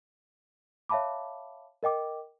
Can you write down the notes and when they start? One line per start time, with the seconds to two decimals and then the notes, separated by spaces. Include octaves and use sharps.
0.89 C#5 E5 F5 A5 B5 D6
1.83 A#4 D#5 G5 D6